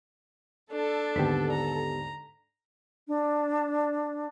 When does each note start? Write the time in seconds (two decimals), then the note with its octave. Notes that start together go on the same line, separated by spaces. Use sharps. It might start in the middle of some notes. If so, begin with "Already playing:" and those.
0.71 D4 A4
1.16 D#2 G#2 D3 B3 G4 B6
1.52 A#5
3.08 D4